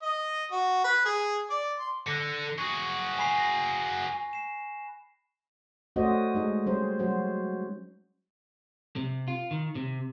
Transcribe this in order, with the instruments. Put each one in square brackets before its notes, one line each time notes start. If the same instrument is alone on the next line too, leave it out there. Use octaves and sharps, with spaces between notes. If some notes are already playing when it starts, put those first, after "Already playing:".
[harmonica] D#5
F#4
B4
G#4
D5
C6
[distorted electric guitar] D3 [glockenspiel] F#6 A#6 C#7
[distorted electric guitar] F#4 G#4 [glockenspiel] C#6
[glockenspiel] G#5 B5 C7
A#6
C7 E7
[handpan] A3 C#4 F#4 C5 D5 D#5
G#3 D#4 G#4
G3 C#4 C5
F#3 C#4 F#4 C5
[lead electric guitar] C3
F4
D#3
C3